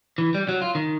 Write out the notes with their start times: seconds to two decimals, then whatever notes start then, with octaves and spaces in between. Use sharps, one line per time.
0.18 E3
0.35 G3
0.49 F#3
0.62 F4
0.75 D#3